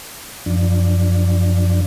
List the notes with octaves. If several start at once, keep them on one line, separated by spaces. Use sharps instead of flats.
F#2 F3 D4